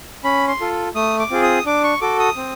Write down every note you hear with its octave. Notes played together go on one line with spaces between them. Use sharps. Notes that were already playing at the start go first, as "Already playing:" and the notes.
C#4 B5
C6
F4 A4
A3 D#6
D6
C4 F4 G#4
D#6
D4 D6
C#6
F#4 A4 D6
D#6
C4